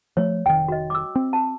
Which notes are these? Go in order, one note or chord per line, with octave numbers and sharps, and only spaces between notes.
F3 A3 C#5
F1 D#3 G5
F#4 D#5
D6 E6
C4
A5